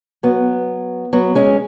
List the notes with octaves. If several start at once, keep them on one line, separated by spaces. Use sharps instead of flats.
F#3 B3
F#3 B3
G#3 C#4